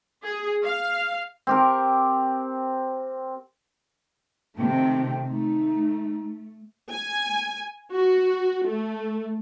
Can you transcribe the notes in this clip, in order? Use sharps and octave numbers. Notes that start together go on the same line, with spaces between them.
G#4
F5
C4 G4 A#4
C3 D#3 A3 G5
A3 D#4
G#5
F#4
A3